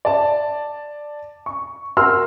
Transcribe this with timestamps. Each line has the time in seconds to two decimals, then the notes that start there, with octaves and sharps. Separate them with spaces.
0.05 D5 A5
1.46 C#6
1.97 F#4 A#4 C6 E6 F6